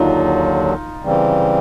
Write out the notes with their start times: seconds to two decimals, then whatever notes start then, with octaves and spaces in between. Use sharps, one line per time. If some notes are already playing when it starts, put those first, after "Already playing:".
Already playing: D#2 D3 F#3 D#4 F4
1.03 C#3 E3 G3 C4